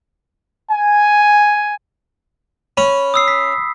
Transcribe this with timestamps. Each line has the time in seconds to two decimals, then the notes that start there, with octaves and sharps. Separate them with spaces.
0.71 G#5
2.77 C#4 B5
3.14 D#6 E6 C7
3.28 B6